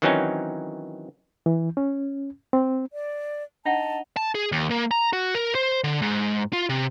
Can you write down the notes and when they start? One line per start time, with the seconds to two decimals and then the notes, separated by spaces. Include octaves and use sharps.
0.02 D#3 E3 F#3 C4 C#4 D#4
1.46 E3
1.77 C#4
2.53 C4
2.92 D5
3.65 D4 D#4 F#5 A5
4.17 A5
4.35 G#4
4.52 D#2
4.70 A#3
4.91 A#5
5.13 F#4
5.35 A#4
5.55 C5
5.84 D3
6.02 G#2
6.53 F4
6.69 C3